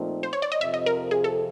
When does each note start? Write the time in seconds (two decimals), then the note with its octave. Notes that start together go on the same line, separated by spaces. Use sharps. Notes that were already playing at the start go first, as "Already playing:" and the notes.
Already playing: A#2 F3 A3 C4 D#4
0.23 C5
0.33 C#5
0.42 D5
0.52 D#5
0.61 F2 C3 F3 E5
0.74 D#5
0.86 A#4
1.11 G#4
1.24 A4